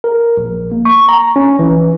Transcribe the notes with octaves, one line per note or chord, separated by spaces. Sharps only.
A#4
A#1
A#3
C#6
A#5
C#4
E3